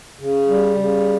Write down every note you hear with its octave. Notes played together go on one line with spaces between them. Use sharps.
C#3
G3
C#3